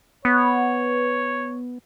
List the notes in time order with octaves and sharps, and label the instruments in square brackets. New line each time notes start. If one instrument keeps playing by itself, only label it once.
[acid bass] B3 [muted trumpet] C#5